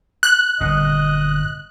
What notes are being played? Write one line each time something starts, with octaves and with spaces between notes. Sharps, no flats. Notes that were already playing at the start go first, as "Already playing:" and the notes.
F#6
G1 A#2 D#5